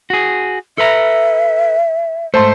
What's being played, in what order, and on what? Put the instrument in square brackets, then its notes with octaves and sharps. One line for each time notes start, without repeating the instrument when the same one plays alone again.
[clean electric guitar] F#4 G#4
[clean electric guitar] A4 B4 A#5 [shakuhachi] E5
[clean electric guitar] G#2 A3 [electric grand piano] C5 A5 C6